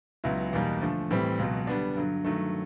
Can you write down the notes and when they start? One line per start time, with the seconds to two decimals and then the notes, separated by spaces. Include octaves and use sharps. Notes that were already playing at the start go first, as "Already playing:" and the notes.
0.24 C#2 C#3 F#3 B3 E4
0.53 E2 B2 G3 A#3 D#4
0.82 D3 F3 A3
1.11 A2 E3 G3 C4
1.39 C#2 B2 F#3
1.67 D3 G3 B3 D4
1.97 G2 D3 F#3
2.24 G2 D#3 F#3 A3